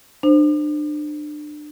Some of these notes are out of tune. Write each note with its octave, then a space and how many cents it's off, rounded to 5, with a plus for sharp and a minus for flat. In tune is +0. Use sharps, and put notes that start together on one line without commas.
D4 +30 C5 +0